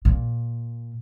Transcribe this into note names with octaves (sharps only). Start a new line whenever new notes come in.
A#2